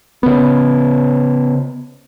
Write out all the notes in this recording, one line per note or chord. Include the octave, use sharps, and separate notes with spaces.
C#3 B3